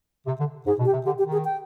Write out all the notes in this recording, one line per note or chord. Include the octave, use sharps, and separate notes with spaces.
C3
D3
G#2 G#4
B2
G4
C3
D3 G4
G4
D#3
G#4
G5